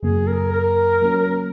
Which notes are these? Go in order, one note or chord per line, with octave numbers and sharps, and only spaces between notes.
F#2 C#3 F#3 A#3 G#4
A#4
A#4
F#3 A#3 C#4